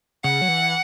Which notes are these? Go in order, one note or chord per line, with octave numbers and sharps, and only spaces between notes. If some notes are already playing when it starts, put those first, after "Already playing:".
C#3 F#5
F#3
E3